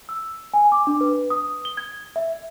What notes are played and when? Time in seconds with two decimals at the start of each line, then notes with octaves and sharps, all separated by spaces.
0.09 E6
0.54 G#5
0.72 D6
0.87 D4
1.01 B4
1.30 D#6
1.65 G7
1.77 G#6
2.16 E5